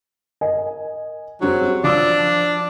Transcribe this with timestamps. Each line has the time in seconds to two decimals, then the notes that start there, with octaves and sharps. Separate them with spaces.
0.41 A#4 D#5 G#5
1.41 F#3 G3 C4 G#4
1.84 F3 D4 D6 E6